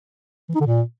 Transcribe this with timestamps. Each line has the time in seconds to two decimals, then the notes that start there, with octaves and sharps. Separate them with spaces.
0.49 E3
0.55 D#4
0.60 D3
0.66 A#2